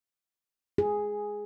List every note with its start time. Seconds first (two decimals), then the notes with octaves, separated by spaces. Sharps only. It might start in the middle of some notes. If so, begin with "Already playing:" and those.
0.78 G#4